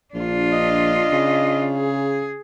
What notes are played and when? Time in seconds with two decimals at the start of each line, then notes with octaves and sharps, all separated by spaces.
0.14 A#1 D4 F4
0.52 D#5
1.13 C#3
1.76 G#4